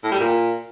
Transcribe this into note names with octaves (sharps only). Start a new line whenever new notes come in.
A2
G3
A#2